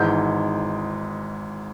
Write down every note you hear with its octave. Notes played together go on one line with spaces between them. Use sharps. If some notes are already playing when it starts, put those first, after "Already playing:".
Already playing: G#1 G#2 E3 G6